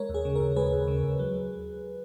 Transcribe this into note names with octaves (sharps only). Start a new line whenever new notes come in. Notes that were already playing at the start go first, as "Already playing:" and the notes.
Already playing: G#3 A#4 C#5
D#2
G#4
C#3
D#2 A#4
G#3 G#4 B4
D#2
C#3
D#2
F#3